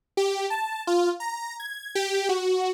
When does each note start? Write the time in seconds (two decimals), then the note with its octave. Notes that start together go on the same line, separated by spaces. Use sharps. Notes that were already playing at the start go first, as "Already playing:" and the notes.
0.17 G4
0.50 A5
0.87 F4
1.20 A#5
1.60 G#6
1.95 G4
2.29 F#4